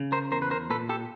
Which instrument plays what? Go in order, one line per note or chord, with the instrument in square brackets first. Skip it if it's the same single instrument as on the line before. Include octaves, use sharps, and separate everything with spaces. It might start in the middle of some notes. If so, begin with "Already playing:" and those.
Already playing: [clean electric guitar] C#3
A#4 C5
E2 A#4 C5
B4
A#4 C5
A#2 A4 B4
G4 A4